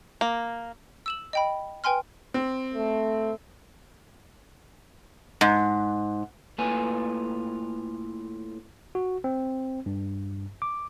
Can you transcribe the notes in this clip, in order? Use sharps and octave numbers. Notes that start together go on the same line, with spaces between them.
A#3
E6 E7 F#7
D#5 G5 B5
B4 G5 G#5 C6 F6
C4
A3
G#2
A2 A#3 F4 B4 G#5
F#4
C4
G2
D6